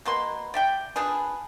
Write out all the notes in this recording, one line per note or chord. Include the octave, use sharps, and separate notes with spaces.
B2 A#3 B4 C6
D5 E5 G5
F3 D4 G#4 B4